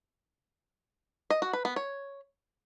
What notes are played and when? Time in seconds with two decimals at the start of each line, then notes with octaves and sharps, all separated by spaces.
1.30 D#5
1.42 F#4
1.53 B4
1.65 B3
1.76 C#5